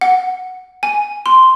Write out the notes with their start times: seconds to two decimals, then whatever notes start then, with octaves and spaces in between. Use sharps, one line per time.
0.01 F#5
0.83 G#5
1.26 C6